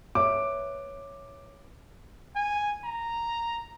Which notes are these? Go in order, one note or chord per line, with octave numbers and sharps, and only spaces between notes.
B4 C#5 E5 D6
G#5
A#5